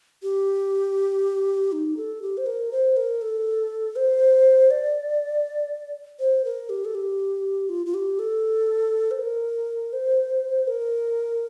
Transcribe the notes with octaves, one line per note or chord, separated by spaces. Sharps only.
G4
D#4
A4
G4
C5
A#4
C5
A#4
A4
C5
D5
C5
A#4
G4
A4
G4
F4
F4
G4
A4
C5
A#4
C5
A#4